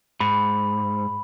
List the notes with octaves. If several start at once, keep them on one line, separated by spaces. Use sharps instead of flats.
G#2 B5